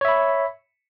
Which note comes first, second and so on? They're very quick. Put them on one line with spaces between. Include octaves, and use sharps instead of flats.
C#5 E5 B5